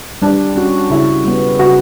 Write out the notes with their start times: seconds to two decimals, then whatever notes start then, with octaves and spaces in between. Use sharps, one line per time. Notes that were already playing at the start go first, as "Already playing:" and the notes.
0.22 G3 D4
0.56 C#4 F#4
0.90 C#3 E4
1.25 G3 B3
1.59 C#3 F#4